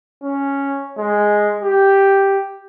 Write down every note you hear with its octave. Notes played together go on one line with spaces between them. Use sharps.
C#4
G#3
G4